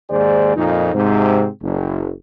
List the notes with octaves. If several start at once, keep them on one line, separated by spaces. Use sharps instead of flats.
D#2 G#2 G#4 C5 D5
F2 A#2 D#4
G#2 C3 C4
F#1